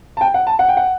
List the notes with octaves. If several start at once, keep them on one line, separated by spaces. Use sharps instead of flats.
A5
G5
F#5
A5
F#5
G5
F#5